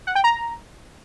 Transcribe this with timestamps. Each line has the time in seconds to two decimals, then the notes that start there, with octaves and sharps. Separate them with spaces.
0.07 F#5
0.15 G5
0.24 A#5